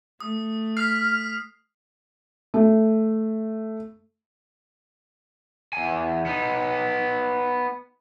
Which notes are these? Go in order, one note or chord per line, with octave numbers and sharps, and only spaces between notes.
A3 D#6
F6 B6 C7
A3
E2 G#5
B3 D#4